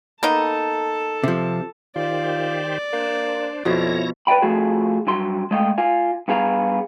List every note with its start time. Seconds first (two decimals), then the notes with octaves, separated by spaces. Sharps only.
0.23 A#3 B3 D#4 A4 A5
1.23 C3 F3
1.96 D#3 F4 G4 C5 D5
2.93 A#3 D4 C5
3.65 F2 B2 F3 E4 C#5 A#6
4.27 B4 D5 E5 G5 B5
4.42 F3 A3 F4 F#4 G#4
5.07 G2 F#3 C6
5.51 G#3 A3 D#5 F5 G5
5.78 F4 F5 G#5
6.28 G2 B3 G#4 F5 A#5